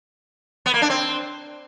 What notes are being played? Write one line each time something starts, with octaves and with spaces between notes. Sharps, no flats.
B3
A#3
D4
C4